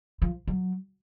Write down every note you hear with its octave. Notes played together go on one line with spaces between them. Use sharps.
F3
F#3